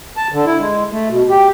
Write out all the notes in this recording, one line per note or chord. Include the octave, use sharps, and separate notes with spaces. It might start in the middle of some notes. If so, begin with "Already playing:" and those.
A5
D3
E4
G#3
A3
B2
G4